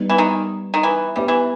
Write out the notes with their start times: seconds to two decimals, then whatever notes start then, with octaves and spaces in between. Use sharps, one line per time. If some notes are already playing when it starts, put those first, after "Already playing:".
Already playing: G3 B3 D#4
0.10 E3
0.18 D#3
0.74 D#3
0.83 E3
1.16 G3 B3 G4 B4 E5
1.28 E3